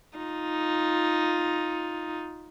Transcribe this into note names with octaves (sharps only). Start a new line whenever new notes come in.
D#4 F4